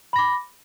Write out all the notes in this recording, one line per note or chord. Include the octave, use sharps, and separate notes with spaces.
B5 D6 A#6